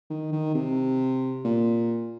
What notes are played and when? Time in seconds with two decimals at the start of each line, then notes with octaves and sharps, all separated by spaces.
0.10 D#3
0.32 D#3
0.54 C3
1.45 A#2